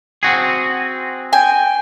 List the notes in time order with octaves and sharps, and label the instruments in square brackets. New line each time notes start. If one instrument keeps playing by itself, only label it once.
[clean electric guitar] C4 F#4 G#4
[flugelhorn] G5 [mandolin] G#5